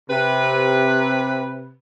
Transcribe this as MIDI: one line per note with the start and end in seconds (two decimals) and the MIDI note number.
0.10 1.73 48
0.10 1.73 71